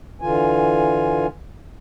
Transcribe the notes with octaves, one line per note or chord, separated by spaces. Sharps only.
D3 E3 F4 G#5